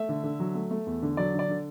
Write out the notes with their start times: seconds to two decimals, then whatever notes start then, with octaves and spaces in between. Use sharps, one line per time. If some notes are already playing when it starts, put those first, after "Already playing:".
Already playing: A3 E5
0.09 D3
0.24 D3
0.40 F#3
0.55 A3
0.71 A3
0.86 E2
1.02 D3
1.17 F#3 D5
1.34 D3
1.39 D5
1.49 D3